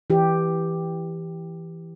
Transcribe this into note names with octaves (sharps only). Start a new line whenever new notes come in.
E3 G4